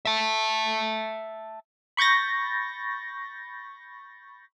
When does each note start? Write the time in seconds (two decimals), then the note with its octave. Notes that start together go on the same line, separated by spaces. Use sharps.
0.05 E5 A5
1.97 B5 C#6 G6 A6 A#6